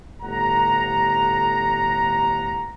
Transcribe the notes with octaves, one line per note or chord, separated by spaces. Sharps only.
G1 A2 G4 F#5 A#5